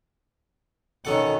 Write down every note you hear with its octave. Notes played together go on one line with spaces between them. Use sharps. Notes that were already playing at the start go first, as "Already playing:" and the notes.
B2 D#3 C#4 A4 F#5